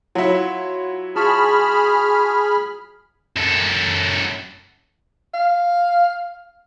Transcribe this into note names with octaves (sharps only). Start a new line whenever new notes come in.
F#3 E4 F4
F4 G#4 A5 B5 C#6 F6
F#2 A4
F5